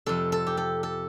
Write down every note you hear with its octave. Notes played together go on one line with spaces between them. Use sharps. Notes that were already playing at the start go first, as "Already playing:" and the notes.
F2 C3 A4
A4
G4
A4
A4